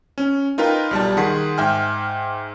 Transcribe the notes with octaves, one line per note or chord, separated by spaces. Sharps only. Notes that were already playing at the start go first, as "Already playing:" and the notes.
C#4
D#4 F4 A#4 B4 G5
B1 G3 A5
D#3 G#4 F#5 C6 B6 C7
G#2 E5 G5 G#5 F6